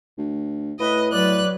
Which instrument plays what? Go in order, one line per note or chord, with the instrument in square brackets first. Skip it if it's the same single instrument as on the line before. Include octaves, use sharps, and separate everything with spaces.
[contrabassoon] D2
[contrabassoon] A2 [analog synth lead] B4 [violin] D#5
[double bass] F#3 [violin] B4 F#6 [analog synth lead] D5